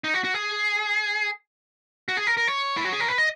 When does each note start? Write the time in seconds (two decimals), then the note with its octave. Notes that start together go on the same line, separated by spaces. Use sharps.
0.04 D#4
0.14 F#4
0.24 F#4
0.34 G#4
2.08 F#4
2.17 G#4
2.27 A#4
2.37 A#4
2.48 C#5
2.77 E4
2.85 F#4
2.93 G#4
3.00 A#4
3.08 B4
3.18 D#5